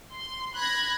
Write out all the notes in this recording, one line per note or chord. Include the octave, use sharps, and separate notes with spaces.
C6
B5 F#6 G#6 A#6